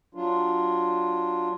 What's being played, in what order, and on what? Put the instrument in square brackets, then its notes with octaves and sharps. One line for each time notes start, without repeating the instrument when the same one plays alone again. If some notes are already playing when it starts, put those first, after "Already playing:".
[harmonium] F#3 D4 F4